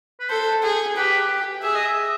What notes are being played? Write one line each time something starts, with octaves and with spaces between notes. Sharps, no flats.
B4
A4 C5
G#4
G4 B4
G#4 E5
D#5
E5